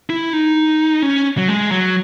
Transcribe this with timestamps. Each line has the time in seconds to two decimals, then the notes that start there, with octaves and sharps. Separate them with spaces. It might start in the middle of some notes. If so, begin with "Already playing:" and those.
0.10 E4
0.33 D#4
1.02 C#4
1.37 F#3
1.48 G#3
1.71 F#3